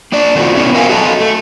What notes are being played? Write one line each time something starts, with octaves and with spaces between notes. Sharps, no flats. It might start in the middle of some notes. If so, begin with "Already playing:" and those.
A#3 D4 D5
B2 D#3 A3 C4 F4 F#4
B3 C#4 E4
A#4 E5 F5 G5 G#5
F#4 A4 D#5 A5
A3